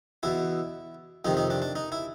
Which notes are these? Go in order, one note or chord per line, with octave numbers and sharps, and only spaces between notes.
E2 B2 E4
F2 C3 D#3 D#4
D#4
D4
D4
D#4
E4